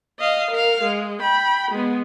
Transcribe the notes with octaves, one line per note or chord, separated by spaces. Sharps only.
D#5 F5
A#4 F5
G#3
G5 B5
G#3 B3